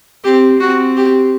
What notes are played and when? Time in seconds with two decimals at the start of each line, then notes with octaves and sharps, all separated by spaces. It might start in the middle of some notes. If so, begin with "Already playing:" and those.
0.24 C4 G4
0.60 C4 F#4
0.97 G4